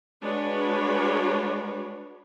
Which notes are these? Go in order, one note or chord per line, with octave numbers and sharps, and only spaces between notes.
G#3 D4 F#4 B4 C#5